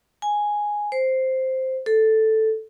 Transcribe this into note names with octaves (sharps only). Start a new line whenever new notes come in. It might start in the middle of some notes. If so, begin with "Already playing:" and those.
G#5
C5
A4